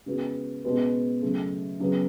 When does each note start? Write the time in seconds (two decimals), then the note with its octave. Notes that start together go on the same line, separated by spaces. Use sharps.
0.06 C#3 G#3 B3 F#4
0.64 B2 G#3 C#4 F#4 B4
1.22 C#3 F#3 A3
1.80 C#3 F#3 B3